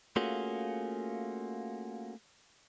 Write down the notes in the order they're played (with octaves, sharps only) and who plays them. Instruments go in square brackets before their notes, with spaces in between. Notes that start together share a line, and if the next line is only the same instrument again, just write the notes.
[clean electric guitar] A3 A#3 C#4 F4 F#4 G#4